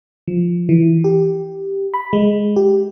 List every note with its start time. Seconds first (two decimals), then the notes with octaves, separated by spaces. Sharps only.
0.28 F3
0.69 E3
1.04 G4
1.94 B5
2.13 G#3
2.56 G4